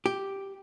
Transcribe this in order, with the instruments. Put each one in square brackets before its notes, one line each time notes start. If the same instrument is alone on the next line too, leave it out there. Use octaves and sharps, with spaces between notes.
[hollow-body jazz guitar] G4